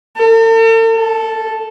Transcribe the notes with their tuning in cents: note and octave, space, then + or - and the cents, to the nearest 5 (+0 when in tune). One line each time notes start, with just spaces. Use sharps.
A4 +45
A4 -5